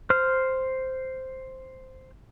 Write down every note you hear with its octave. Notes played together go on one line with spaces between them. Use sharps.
C5 F6